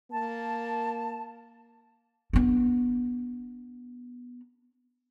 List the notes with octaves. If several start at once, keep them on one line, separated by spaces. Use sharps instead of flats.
A#3 A5
B3 D4